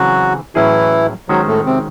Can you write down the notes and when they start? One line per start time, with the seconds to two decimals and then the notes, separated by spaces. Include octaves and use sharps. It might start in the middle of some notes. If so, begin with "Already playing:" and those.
Already playing: C#3 E3 F#3 C4 F#4
0.55 A2 E3 F#3 C#4 E4 G#4
1.29 D#3 F#3 G#3 C#4 F#4 C5
1.48 A2 A3
1.66 C3 C4